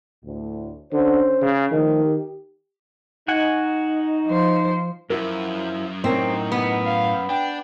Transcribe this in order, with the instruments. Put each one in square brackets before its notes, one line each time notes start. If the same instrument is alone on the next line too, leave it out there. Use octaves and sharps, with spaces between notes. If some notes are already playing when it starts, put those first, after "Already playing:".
[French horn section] D2 A2
[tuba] D3 [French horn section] C#4 C5
[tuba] C#3
[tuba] D#3 [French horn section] F3 A3 D#4
[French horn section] G4
[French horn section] D#4 [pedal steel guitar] F#4 F#5 G#5
[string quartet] F3 C5
[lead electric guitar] F#2 [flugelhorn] F3 [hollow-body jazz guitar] E4 F#4 A#4
[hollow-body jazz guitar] A2 A#4 C#5 [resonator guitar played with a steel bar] C4 [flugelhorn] D#4
[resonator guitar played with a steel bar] B3
[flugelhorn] F5
[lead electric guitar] D4 [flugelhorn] G5